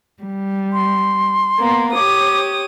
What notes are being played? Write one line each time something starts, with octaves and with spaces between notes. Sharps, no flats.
G3
C6
A#3 B3
G4 C#5 D6 D#6